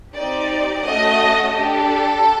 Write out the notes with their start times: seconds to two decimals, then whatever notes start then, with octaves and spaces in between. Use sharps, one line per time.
0.14 C4 D#4 G4 D5
0.84 A3 C#4 F#4 A4 D#5
1.53 D4 G4 A4